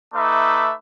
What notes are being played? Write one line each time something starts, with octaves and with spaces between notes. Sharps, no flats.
A3 D#4 B4 E5 D6